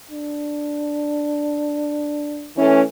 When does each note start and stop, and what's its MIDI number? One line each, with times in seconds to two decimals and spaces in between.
0.11 2.52 62
2.57 2.82 52
2.57 2.82 57
2.57 2.82 61